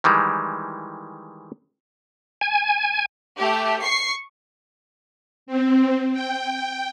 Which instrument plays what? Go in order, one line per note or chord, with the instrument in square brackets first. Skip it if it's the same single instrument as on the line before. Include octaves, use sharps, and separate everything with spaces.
[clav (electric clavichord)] D#3 E3 G3 G#3
[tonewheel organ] G#5
[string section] A3 G4
C#6 C7
[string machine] C4
G5